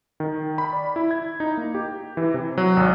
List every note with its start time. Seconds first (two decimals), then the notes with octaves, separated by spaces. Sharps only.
0.20 D#3
0.58 B5
0.73 D5
0.96 E4
1.11 G#6
1.40 D#4
1.57 A#3
1.74 G4
2.17 E3
2.34 C3
2.58 F#3
2.77 G#1